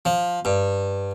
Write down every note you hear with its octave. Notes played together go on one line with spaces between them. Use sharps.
F3
G2